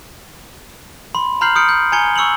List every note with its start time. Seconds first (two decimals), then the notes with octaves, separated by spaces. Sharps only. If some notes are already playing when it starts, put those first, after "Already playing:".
1.15 B5 C6
1.41 A#5 B5 F6 G6 C7 F#7
1.56 D#6 F6 G6 C#7 D7
1.69 G6
1.92 G#5 A#5 G#6 C#7 G7
2.16 C#6 E6 C#7 F7 F#7